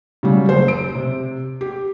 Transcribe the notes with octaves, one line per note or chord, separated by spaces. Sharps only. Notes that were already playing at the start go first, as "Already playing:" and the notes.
C#3 F#3 G3
F#1 C5
D7
C3
G4